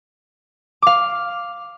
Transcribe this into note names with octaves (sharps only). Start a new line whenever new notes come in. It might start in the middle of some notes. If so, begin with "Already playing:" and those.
F5 D6